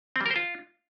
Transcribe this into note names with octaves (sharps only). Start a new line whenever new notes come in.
C4
G3
A#4
C5
F4